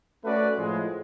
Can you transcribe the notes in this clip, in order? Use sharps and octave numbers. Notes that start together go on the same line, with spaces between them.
A3 C#4 F#4 B4 D5
A2 F3 G#3